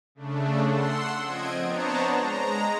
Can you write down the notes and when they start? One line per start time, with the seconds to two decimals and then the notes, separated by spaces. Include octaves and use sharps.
0.15 C#3 A3 D4
0.67 F#5 C6 E6
1.24 F3 C4 D#5 G#6 D7
1.63 B3 D4 C5 C#5 A5 A#5
2.16 G#3 A#5